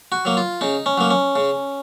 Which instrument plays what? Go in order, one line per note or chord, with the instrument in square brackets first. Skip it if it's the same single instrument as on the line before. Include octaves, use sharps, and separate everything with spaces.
[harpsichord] F#4
F#3 A#3
F4
C#3 D#4
C#4
F#3 A#3
C#4
C#3